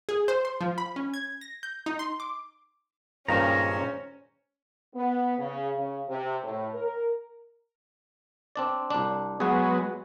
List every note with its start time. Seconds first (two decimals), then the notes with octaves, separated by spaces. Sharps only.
0.09 G#4
0.28 C5
0.45 C6
0.61 F3
0.78 B5
0.96 C#4
1.14 G#6
1.41 A#6
1.63 G6
1.86 D#4
1.99 C6
2.20 D6
3.28 G2 A#2 D#3 G#3 C#4 C5 A#5
4.95 B3
5.38 C#3
5.76 C#3
6.09 C3
6.44 A2
6.73 A#4
8.56 C4 D4 D5
8.90 C2 D4
9.40 F#3 G#3 B3 F#4 G#4